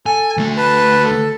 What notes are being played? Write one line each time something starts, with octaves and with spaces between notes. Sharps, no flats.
A4 G#5
D2 A3
B4 A5
A4